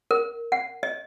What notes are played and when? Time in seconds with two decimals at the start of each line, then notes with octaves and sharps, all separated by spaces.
0.11 A#4
0.52 F#5
0.83 D#5